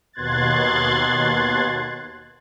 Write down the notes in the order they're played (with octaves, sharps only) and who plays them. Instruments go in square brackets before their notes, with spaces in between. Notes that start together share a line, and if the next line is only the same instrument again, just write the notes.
[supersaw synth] D#2 B2 C6 F#6 G#6 A6